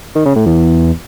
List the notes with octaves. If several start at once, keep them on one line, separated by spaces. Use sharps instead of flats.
D#3
C#3
A2
E2